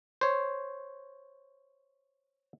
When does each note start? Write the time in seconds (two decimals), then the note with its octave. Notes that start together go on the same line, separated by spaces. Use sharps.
0.21 C5 C#5